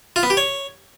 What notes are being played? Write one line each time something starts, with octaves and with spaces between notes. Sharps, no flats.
F4
B3
G4
C#5